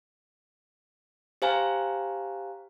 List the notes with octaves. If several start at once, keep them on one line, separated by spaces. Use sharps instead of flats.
G4 C5 F5 G#5 A#5